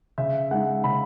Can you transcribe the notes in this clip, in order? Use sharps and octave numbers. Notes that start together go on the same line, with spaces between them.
C#3 E5
G#3 D#4 F#5
C#3 B5